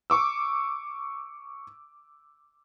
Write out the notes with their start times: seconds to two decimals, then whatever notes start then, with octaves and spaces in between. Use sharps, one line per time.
0.10 C#6 D6 E6